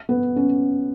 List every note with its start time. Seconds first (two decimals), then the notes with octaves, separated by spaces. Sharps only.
0.09 B3
0.36 C#4